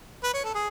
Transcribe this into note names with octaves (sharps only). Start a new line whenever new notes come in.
B4
C#5
A4
G#4